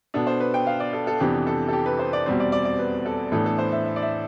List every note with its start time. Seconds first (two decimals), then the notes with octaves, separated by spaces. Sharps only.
0.14 B2 B3 D4 A4
0.27 C5
0.40 B4
0.54 G5
0.67 F5
0.80 D5
0.93 A4
1.07 A4
1.20 F2 C3 E3 B3 D4 G4
1.47 A4
1.68 A4
1.73 G4
1.86 B4
1.99 C5
2.13 D5
2.26 E2 B2 G3 C4
2.40 D5
2.52 D5
2.65 D5
2.79 B4
3.06 A4
3.32 A2 E3 B3 D4 A4
3.46 A4
3.58 C5
3.72 E5
3.85 E5
3.96 D5
4.02 E5